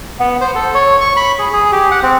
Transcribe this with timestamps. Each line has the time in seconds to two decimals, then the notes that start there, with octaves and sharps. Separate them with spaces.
0.19 B3
0.41 C5
0.55 A4
0.74 C#5
1.01 C#6
1.16 B5
1.39 G#4
1.53 G#4
1.72 G4
1.91 F#5
2.02 C4